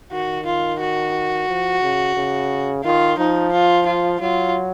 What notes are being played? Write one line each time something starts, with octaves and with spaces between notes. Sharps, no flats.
D#3 F#4
F4
F#4
F3
C#3
C#3
D#3 F4
F3 D#4
F4
F4
F#3 F4